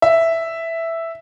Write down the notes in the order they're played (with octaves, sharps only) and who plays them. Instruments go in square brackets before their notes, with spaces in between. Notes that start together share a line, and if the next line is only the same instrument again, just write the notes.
[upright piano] E5